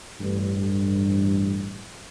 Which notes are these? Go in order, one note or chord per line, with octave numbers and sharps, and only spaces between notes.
A1 G2